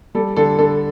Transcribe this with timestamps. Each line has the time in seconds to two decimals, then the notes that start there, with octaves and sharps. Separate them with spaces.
0.15 G3 A4
0.36 D3 A4
0.58 D3 A4